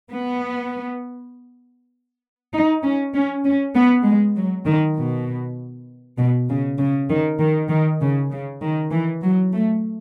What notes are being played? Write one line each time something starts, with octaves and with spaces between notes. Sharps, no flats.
B3
D#4
C#4
C#4
C#4
B3
G#3
F#3
D#3
B2
B2
C#3
C#3
D#3
D#3
D#3
C#3
C#3
D#3
E3
F#3
A3